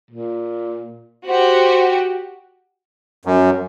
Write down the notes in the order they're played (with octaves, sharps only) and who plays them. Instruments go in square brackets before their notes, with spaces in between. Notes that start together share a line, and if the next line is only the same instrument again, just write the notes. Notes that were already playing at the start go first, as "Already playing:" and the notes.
[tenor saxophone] A#2
[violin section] F#4 G4 [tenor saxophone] C5
[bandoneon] F#2